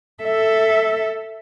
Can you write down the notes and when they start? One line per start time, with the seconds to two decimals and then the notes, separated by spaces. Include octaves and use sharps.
0.23 A4 E5